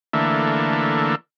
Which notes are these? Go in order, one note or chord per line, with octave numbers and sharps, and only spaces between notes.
D3 E3 A3 A#3